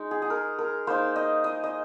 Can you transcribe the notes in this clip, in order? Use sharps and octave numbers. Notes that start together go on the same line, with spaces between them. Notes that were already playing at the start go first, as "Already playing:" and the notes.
Already playing: G#3 D#4
G#4
G#4
A#4
A#4
A#3 D#4 C5
D#5
D#5
D#5